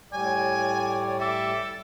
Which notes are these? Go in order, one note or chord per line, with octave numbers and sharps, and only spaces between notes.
A2 G3 C#5 D5 G#5
A4 E5 D6